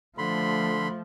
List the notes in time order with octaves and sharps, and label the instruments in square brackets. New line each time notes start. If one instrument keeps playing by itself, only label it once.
[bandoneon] D3 B5 C6 [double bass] F3 A3